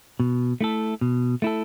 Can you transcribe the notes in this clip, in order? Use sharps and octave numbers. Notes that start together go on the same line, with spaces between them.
B2
A3 E4 A4
B2
A3 E4 A4